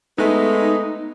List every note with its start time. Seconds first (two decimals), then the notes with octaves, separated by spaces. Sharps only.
0.18 G#3 A3 B3 D#4